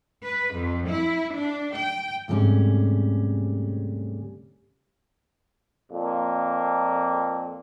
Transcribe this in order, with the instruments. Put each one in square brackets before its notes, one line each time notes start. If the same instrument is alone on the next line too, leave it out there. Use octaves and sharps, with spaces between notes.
[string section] B4
F2
E4
D4
G5
[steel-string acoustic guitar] D2 G#2 C3 G3 C#4
[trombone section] F2 A#2 A#3